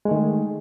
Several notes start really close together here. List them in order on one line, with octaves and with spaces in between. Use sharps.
G#3 A3 D#3